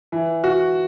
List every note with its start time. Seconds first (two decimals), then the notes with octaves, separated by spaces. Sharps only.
0.12 E3
0.44 F#4